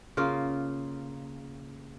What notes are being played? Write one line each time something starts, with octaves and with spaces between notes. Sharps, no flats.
C#3 A#3 F4